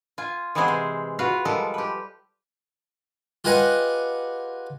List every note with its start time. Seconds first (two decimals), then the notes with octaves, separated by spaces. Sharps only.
0.18 F4 G#5
0.55 E3 G#3 B3 C4 G#4 C5
0.68 C3
1.19 F4 F#4 B4 F5
1.45 F3 G3 G#3 A4 A#4
1.74 G4 B4
3.44 F4 G4 G#4 B4 D#5 F#5